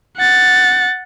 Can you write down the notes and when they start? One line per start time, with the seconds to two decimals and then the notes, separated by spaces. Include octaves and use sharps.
0.17 F#5 A6